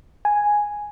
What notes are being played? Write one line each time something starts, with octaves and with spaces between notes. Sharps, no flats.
G#5